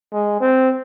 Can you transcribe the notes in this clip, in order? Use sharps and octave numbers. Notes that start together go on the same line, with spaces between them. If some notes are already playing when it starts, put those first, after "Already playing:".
G#3
C4